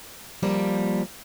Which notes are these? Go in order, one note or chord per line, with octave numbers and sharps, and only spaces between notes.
F3 G3 A#3